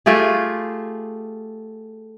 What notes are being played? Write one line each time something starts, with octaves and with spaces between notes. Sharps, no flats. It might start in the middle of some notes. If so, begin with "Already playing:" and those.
A3 F4 G4 G#4